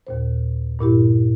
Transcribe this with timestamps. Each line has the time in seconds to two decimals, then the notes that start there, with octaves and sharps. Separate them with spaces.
0.07 D#2 A#2 C5
0.79 G2 A#2 E4 G4